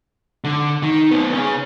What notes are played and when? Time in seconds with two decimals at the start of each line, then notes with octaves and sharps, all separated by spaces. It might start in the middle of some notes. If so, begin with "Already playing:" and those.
0.44 D3
0.83 D#3
1.11 B3 C#4
1.34 C#4 G#4